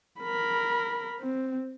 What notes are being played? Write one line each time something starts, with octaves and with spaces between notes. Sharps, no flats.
A#4 B5
C4